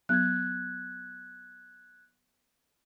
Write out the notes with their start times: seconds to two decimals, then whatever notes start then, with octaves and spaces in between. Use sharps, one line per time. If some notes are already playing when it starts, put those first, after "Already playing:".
0.09 F#3 B3 F#6 G#6